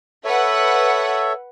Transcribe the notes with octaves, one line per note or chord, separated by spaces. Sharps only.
A4 B4 C#5 E5 F#5